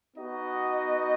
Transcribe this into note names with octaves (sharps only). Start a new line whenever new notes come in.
B3 D#4 F#4 D#5